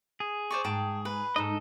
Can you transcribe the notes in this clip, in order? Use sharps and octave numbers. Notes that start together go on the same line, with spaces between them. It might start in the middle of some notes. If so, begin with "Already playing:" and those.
G#4
C5 D5 C#6
G#2 G5 A5
B4
G#2 D#4 A4 D#5